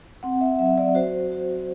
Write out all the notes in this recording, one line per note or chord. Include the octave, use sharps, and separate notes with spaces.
C4 F#5
E5
F#3 E5
D5
F#4 C5
F#4